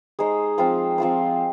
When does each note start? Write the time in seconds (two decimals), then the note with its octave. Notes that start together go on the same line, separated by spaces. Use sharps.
0.19 G#3 D#4 G#4 C5
0.58 F3 C4 F4 C5
0.98 F3 C4 F4 C5